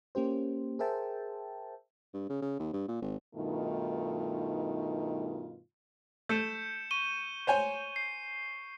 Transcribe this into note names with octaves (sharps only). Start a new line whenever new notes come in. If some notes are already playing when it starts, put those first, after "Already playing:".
A#3 C#4 G4 C5
G#4 A#4 C5 E5 G5 A5
G2
C#3
C#3
D#2
G2
A#2
G#1
G2 B2 D#3 A3 D#4 F4
A3 G6 C#7 E7
C#6 D#7 G7
C5 C#5 G#5
C7